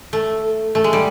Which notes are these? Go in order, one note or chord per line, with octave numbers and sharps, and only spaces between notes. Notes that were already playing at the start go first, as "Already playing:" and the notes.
A3
A3
G#3
G3